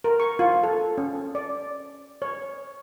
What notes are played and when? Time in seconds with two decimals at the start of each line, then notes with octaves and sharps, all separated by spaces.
0.04 A#4
0.20 C#6
0.39 F4
0.64 A4
0.98 C#4
1.35 D5
2.22 C#5